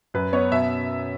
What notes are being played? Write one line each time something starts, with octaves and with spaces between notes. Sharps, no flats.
F#2 B4
B3 C#5
B2 E5